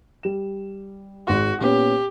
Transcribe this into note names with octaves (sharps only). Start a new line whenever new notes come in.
G3 E7
G#1 F#4 G#4 C6
A#2 B3 C#4 G4